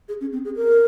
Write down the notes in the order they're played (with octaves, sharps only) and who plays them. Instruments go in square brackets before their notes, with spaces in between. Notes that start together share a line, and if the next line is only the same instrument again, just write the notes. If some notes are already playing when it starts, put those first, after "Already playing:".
[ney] G#4
C#4
C4
G#4
A#4